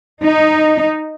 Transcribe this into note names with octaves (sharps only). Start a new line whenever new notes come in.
D#4